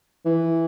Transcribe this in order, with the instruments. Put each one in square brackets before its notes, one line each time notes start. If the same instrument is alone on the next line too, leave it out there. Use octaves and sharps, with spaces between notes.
[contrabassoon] E3